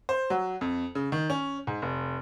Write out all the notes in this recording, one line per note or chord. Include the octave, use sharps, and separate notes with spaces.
C5
F#3
F2
C#3
D#3
C#4
G#2
F1